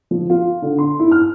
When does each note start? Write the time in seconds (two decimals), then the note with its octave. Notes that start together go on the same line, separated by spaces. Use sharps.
0.11 F3
0.30 F4
0.62 D3
0.79 C6
0.99 E4
1.12 F6